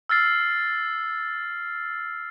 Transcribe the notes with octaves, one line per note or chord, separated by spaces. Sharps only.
E6 F6 A6 C7